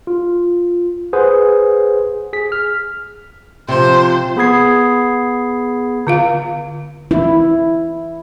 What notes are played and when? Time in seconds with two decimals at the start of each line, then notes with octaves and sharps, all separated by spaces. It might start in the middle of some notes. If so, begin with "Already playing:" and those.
0.07 F4
1.13 G#4 B4 C5 F#5
2.33 G#4 B6
2.52 F6
3.68 C3 F3 C5
4.36 B3 G#4 B5 D#6 G#6 C7
6.07 D3 F4 F5
7.11 E4